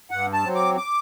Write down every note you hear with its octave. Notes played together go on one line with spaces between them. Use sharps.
G2 F#5
A5
F#3 C4
D6
D6